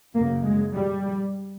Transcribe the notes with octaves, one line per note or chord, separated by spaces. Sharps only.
F#2 C#3 A#3
G#3
G3